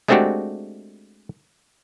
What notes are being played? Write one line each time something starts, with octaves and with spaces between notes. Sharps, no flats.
G#3 A3 C4 D4 F#4 G4